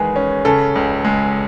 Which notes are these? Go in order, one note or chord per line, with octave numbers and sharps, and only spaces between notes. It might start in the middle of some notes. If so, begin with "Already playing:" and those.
Already playing: E2 D#3 G#3 G#4 B4
C#4
C#3 A4
C#2
G#3